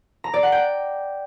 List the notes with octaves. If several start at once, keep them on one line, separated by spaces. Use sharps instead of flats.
A#5
D5
F#5
G5